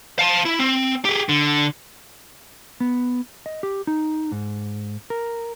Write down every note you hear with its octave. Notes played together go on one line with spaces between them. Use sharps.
F5 A5
E4
C4
G4 G#4
D3
B3
D#5
G4
D#4
G#2
A#4